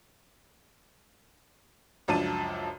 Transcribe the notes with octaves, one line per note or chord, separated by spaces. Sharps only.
C#2 F#2 F3 D4 A5 D#7